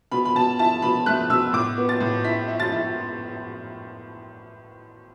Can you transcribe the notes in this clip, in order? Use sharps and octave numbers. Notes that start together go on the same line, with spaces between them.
B2 B5
B5
B2 A5
E4 A5
B2 B5
A3 F#6
B2 E6
A2 D6
B3
A6
A2
E4 B6
E4
A6
E4